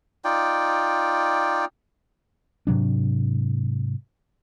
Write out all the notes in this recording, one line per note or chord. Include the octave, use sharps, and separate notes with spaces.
D#4 F4 D5 G5
G#2 C3 F#3 D4